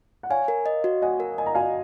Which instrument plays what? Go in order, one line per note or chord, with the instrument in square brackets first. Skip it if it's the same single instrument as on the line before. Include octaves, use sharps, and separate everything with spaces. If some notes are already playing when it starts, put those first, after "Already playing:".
[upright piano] F#5
[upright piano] C#5 F5 [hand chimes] G#5
[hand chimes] A#4
D#5
F#4
[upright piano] D#5 F#5 [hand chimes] G#5
[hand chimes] A#4
[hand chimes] D#5 [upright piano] G#5
[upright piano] A#5
[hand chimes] F#4 [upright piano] F5 G#5